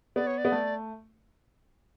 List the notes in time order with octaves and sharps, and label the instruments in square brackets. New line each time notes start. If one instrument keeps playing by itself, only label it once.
[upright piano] B3 [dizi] D5
[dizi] C#5
D5
[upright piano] B3
A3